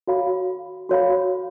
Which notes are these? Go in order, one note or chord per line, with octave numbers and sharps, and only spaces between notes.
F#4 C#5 F5 B5
F#4 C#5 F5 B5